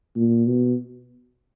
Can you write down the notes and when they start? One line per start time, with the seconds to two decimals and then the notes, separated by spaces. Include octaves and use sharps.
0.16 A#2
0.47 B2